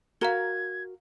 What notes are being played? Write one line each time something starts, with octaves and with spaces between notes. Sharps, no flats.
F#4 A#4 F5 A#5 G#6 G7